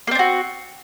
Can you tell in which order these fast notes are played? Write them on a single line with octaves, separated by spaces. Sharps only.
A#3 C4 D4 F#4